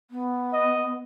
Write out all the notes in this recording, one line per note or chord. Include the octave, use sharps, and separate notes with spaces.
B3
D#5